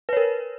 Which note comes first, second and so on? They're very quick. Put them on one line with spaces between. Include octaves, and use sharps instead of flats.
B4 C#5 A#4